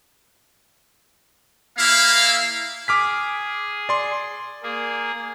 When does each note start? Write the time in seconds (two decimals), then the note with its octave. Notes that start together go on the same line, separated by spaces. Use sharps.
1.78 A#3 E4 F5
2.88 G#4 D6 F6 B6
3.89 D5 C6
4.63 A#3 G#4